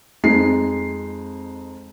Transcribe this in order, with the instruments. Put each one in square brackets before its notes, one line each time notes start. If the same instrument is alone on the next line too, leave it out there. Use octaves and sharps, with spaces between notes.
[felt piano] F2 G#3 D#4 C7